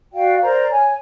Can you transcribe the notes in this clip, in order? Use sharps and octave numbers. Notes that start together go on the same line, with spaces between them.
F#4 D5 F5 G5
A#4 C5 D5 A#5
C#5 G#5